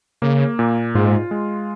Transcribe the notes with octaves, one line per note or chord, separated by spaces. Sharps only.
C#3 A#3
A#2
G#2 F4
G#3